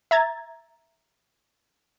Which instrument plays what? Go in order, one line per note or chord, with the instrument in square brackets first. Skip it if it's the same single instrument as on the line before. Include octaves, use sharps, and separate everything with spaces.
[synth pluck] E5 A#5 G#6 A6